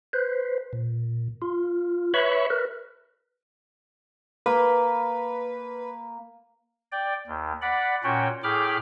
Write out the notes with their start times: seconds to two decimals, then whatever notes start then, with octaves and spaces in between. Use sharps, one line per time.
0.13 B4 C5
0.73 A#2
1.42 F4
2.14 B4 C#5 E5 B5 C#6
2.50 A#4 B4
4.46 A#3 B4
6.92 D5 G5
7.27 D#2
7.62 D5 F#5 B5
8.04 A#2 C#4 F#4 C#5 G5
8.44 A2 G#4 G5 B5 D6 F6